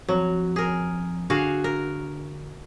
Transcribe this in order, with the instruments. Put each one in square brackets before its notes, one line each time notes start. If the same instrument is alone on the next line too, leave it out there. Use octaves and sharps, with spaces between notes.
[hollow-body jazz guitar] F2 [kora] F#3
[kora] G#4 A#4
[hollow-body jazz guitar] D3 [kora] F#4 G#4 F5
[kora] A#4